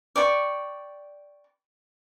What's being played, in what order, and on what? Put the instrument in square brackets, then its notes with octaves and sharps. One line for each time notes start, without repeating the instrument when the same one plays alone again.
[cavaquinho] D5 G5 C#6